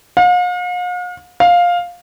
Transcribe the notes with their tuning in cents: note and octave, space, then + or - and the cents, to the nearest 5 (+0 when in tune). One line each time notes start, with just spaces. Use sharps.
F5 +45
F5 +10